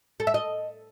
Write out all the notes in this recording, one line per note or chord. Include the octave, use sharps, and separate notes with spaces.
A4
E5
D#5